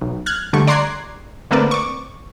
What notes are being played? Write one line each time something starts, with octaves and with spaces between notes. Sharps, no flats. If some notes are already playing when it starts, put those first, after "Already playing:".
B1
F6 F#6 G#6
D3 G3 A3 C#6
D5 A#5 C6 F#6 G#6 C7
D3 A3 A#3 C4 B4 D5
C#6 D6